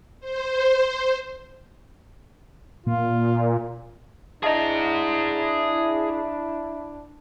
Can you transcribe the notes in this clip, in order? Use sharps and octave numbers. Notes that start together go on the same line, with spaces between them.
C5
A#2 F4
D4 E4 G#4 D#5 E5 A5 A#5